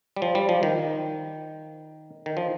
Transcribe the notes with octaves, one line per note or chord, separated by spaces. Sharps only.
G3
F3
G3
F3
D#3
D#3
F3